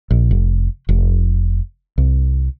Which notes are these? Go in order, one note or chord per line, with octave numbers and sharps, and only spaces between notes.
A#1
F1
F1
C2